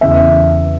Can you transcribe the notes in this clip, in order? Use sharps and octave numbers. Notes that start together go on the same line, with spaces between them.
E2 C#3 E3 E5